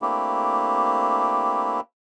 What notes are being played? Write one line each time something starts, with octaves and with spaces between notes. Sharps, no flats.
A3 A#3 C4 D4 E4 G4